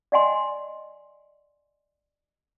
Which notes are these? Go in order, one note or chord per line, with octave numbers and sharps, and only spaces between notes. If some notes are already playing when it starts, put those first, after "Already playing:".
D5 D#5 F#5 G#5 C6